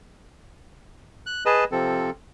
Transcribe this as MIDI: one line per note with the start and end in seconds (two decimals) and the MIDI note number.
1.26 1.44 90
1.46 1.64 68
1.46 1.64 71
1.46 1.64 75
1.46 1.64 81
1.72 2.10 48
1.72 2.10 53
1.72 2.10 60
1.72 2.10 69